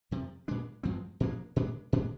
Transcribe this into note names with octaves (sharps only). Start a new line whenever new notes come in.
F2 C3 F3
A#2 G#3 D4
G2 F3 G#3 C4
A#2 F3 A#3 D4
A#2 G#3 D4
A#2 G#3 D4